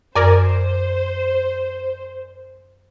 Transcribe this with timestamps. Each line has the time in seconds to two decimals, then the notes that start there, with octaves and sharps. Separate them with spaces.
0.16 F#2 A#4 C5 D5 G#5